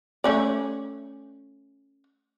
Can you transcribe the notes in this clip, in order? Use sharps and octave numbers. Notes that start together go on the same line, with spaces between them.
A3 C#4 D5